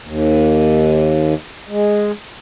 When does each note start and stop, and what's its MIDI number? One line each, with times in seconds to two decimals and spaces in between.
0.05 1.34 39
1.69 2.12 56